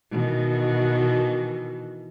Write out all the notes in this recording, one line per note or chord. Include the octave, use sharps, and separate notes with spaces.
B2 D#3 E3